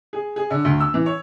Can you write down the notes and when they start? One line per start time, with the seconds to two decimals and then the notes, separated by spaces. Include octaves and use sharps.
0.13 G#4
0.36 G#4
0.50 D3
0.65 D2
0.80 E6
0.94 E3
1.06 C#5